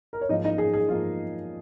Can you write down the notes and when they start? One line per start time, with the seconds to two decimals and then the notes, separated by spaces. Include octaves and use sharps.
0.13 A#4
0.21 C#5
0.29 G#2 F3 A#3 D#4 D#5
0.44 D#4 D#5
0.58 G#4
0.73 G#4
0.89 G#2 F3 A#3 F4